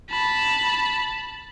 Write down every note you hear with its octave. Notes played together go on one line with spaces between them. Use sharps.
A5 B5